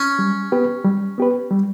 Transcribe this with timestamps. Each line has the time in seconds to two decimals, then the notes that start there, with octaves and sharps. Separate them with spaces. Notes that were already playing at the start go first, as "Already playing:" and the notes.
Already playing: C#4
0.19 G3
0.52 B3 G4 B4
0.84 G3
1.18 B3 G4 B4
1.51 G3